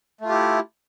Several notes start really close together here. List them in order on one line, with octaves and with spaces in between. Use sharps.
A3 F4 G4 E4